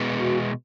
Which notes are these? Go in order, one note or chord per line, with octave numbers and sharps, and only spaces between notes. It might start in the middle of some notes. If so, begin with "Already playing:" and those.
Already playing: B2 G#3 B3
F#4